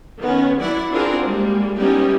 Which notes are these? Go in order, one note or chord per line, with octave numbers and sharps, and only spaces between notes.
D#3 B3 C#4
F#3 E4 D5 F#5
C4 D4 F4 F#4 G#4 A#4
G3 G#3 A#3
G3 B3 C#4 D#4 E4 G4